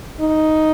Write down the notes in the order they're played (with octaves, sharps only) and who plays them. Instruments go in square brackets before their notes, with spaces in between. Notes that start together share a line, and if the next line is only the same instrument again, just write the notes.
[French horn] D#4